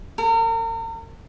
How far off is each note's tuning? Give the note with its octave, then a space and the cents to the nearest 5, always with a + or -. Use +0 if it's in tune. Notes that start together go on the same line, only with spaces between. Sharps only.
A#4 -40